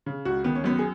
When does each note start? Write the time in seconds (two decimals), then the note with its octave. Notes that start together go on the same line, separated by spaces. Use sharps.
0.06 C#3
0.25 C#2 F#4
0.44 D#3 B3
0.55 C#4
0.64 F#2 B3
0.79 G#4